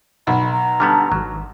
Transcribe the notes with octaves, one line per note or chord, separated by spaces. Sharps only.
B1 B5
A#5
D3 G3 B3 A5 F6
G#1 F#3